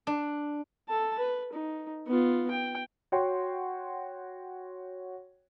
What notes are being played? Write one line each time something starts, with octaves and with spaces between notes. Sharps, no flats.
D4
A4 A5
B4
D#4
B3 F4
G5
F#4 C#5 F#5 G5 C6